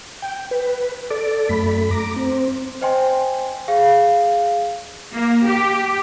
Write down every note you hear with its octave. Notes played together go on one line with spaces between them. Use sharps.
G5
B4
A4 D5
F#2 A3 B5
A#5 D6
C4
C5 D#5 G5 G#5 C6
G#4 F5
A#3
G4